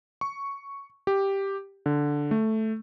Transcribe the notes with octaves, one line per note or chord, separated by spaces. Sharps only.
C#6
G4
D3
A3